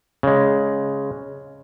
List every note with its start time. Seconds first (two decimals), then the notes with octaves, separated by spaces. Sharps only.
0.23 C#3 G#3